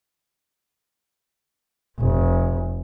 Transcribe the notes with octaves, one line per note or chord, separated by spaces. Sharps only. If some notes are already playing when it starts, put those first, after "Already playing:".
F1